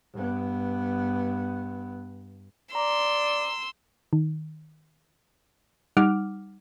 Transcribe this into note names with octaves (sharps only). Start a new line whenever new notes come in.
G2 B3
D5 A#5 C6 E6
D#3
G3 D#4 F#5 D6 F6